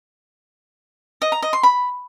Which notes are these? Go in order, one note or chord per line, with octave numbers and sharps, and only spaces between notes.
D#5
A#5
D#5
C6
B5